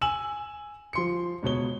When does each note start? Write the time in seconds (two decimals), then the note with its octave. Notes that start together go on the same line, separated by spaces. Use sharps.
0.01 G#5 E6 E7 F#7
0.93 F3 C6 C#7
1.43 C#2 B2 C#5 G7